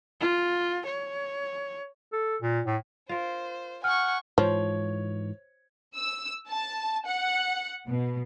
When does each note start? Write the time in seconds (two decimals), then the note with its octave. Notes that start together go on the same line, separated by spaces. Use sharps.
0.21 F4
0.86 C#5
2.13 A4
2.42 A#2
2.66 A2
3.09 F4 A#4 C5
3.84 F#5 G#5 C#6 F6
4.38 G#2 E3 F3 C#5
5.96 E6
6.49 A5
7.06 F#5
7.88 B2